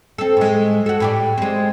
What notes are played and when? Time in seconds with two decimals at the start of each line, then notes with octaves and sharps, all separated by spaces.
0.18 C4 A4
0.37 A2 G#3
0.86 F#4 A4
1.00 A2 G4 D5
1.38 G#3 C4